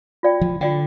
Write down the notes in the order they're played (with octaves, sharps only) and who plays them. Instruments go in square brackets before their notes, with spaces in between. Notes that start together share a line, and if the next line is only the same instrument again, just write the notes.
[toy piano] F4 D5 G5
[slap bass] F3
[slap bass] D3 [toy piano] F4 D5 G5